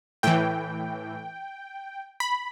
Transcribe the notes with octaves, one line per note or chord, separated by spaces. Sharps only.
A2 E3 G5
B5